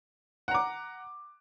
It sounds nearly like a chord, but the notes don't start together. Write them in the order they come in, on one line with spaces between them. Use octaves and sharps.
F#5 A#5 D6